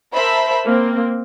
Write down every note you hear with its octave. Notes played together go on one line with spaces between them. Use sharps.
A#4 C5 E5 A5 B5
A#3 C4